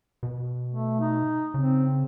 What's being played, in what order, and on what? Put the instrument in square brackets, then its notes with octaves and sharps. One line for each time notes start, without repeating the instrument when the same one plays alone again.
[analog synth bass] B2
[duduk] A3
D#4
[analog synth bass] C#3 [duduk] C4